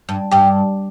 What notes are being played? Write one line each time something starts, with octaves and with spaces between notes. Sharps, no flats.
G2
G2 G4